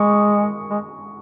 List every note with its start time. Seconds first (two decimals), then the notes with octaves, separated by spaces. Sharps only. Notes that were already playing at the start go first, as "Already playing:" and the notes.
Already playing: G#3 C#6
0.70 G#3